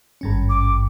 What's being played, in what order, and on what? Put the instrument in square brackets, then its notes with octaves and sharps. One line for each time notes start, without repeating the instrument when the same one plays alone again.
[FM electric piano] G#1 G2 C#4
[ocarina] D6